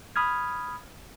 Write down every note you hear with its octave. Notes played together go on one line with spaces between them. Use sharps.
B5 D#6 F6 G#6